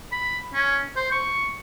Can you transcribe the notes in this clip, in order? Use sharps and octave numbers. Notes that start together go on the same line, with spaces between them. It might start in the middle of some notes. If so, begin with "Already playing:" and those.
B5
C#4
C5
C#6